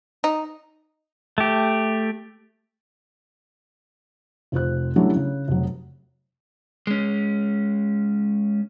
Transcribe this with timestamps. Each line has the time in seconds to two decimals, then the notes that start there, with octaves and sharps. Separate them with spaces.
0.24 D#4
1.38 A3 G4
4.52 F1 F4 C5 F#6
4.96 F#3 G3 A3 C#4 D4 E4
5.16 C#3
5.48 F1 F#3
6.87 G#3 C#4